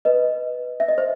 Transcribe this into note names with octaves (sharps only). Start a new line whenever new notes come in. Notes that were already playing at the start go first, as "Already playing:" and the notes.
B4 D#5
E5
D#5
C5